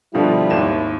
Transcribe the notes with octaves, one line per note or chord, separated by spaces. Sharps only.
B2 D3 F3 G3 E4 F4
G#1 D#2 E7